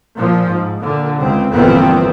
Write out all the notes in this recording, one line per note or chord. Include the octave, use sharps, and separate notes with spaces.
A#2 F3
G#2
A#2 D3
C#2 C4
G1 F2 A#2 E3 B3 C4